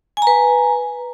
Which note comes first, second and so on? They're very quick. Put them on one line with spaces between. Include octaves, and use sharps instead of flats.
G#5 A#5 B4